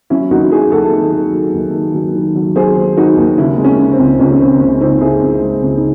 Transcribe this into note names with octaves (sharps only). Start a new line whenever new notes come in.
F#3 C#4 E4
D#2 D#4 F#4
F#3 E4 G#4
D#2 F#4 A4
D#3
D#3
F#3
D#2
D#3
F#3
D#3
F#3
F#3 G#4 C5
D#2
D#3 D#4 F#4
D#2
C#3 C#4 E4
G#3
C#4
C#3
C4
C#2
C#2 C#4
C#4
C#3 C4
C#2 C#4
C#2 C4 D#4
G#3 E4 G#4
C#2
G#3
C#2
D#4